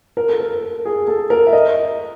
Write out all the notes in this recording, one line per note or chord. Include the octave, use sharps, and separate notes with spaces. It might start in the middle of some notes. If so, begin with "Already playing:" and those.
A#4
A4
A#4
G#4
A4
A#4
E5
D#5